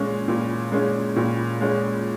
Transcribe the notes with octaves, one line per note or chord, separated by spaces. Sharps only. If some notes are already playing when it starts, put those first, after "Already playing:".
Already playing: A#2 G#3 C#4
A#2
G#3 C#4
A#2
G#3 C#4